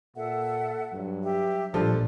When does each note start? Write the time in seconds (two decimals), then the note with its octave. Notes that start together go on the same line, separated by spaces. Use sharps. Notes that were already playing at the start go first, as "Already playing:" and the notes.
0.16 A#2 A4 E5 F#5
0.93 G2 F#3
1.23 G4 E5
1.74 A1 A#2 F3 G3 D4 A4 D5